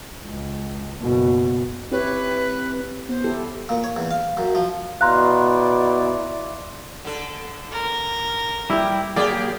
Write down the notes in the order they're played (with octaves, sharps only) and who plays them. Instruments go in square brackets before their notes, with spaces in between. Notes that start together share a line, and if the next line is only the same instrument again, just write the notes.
[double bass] C#2
F#1 B2
[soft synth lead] C4 [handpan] E4 G4 C#5 [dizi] B4
[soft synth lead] B3 [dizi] C5
[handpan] E4 G4 A4
[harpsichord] A#2
C#5
E2
F5
F#2
F3
[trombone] B2 [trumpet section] E4 D5 [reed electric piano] F5 A#5 [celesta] C6 F#6
[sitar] D3 A4
[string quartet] A#4
[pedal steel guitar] G3 G4 [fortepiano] E4
[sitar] F#3 G4 G#4 [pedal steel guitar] A#3 [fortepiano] D5